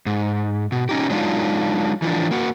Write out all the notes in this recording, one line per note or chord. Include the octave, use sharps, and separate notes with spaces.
G#2
B2
C#4 D#4 G4
F#3 G#3 D4 D#4 F4
E3 F3 D4
A#3 F#4